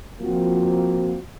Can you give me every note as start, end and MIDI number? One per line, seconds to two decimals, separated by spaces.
0.21 1.18 53
0.21 1.18 58
0.21 1.18 60
0.21 1.18 66